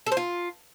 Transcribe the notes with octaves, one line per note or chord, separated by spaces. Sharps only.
A4
C5
F4